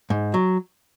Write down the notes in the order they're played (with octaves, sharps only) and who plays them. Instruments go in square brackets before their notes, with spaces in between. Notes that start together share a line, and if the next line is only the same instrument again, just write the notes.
[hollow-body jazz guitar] G#2
F#3